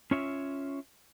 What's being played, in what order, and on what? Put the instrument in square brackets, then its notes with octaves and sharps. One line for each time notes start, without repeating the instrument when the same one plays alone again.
[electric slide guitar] C#4 F4 C#5 E5